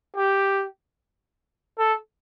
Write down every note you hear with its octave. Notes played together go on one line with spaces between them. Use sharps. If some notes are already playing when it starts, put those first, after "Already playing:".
G4
A4